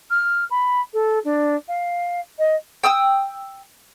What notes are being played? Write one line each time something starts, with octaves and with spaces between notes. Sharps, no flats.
F6
B5
A4
D4
F5
D#5
G5 D#6 E6